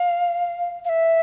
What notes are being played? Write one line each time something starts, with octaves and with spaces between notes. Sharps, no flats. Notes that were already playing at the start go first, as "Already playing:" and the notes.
Already playing: F5
F5
E5